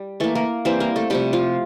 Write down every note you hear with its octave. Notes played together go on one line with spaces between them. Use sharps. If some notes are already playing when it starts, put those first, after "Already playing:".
Already playing: G3
E3 A3 A#3 A4
A#3 A#4
E3 G3 A#3 C4 C5
A#3 A#4
A3 A4
C3 F3 G3 A3 G4
F3 F4